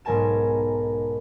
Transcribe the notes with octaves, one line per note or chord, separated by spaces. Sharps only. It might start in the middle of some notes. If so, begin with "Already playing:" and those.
B1 G#2 A#4 G#5 A5 E7